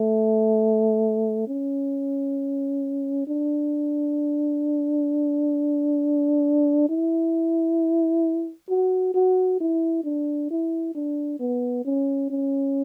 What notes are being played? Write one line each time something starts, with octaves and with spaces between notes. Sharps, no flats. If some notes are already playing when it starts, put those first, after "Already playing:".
Already playing: A3
C#4
D4
E4
F#4
F#4
E4
D4
E4
D4
B3
C#4
C#4